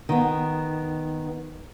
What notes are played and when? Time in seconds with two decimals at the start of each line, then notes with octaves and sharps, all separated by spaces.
0.09 D#3 B3